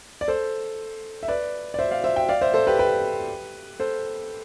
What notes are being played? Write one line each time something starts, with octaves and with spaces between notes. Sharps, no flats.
D5
A4 C5
E5
B4 D5
D5
C5 E5
D5 F5
C5 E5
E5 G5
D5 F5
C5 E5
A4 C5
G4 B4
G4 B4
A4 C5